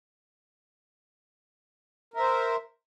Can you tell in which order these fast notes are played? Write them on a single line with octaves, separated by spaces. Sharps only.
A#4 E5 C5